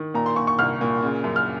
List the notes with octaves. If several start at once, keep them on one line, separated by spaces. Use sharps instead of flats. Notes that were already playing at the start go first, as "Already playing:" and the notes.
Already playing: D#3
A#2 A#5
C6
A#2 C#6
C#6
C2 F6
A#2
C#3
F#2
F6